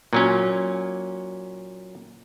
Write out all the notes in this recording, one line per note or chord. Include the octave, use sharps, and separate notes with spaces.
A#2 F#3 C#4